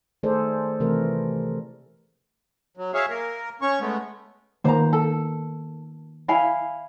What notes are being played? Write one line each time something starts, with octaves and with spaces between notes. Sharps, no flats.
D#3 A3 G#4 A4 C5 D5
C3 E3 A3 A#4
F#3
G#4 C#5 E5 F5
A#3 A#4
C#4 C#5 C#6
G#3 A3 B3
D#3 A#3 B3 C5 A#5
A4
E4 F5 G#5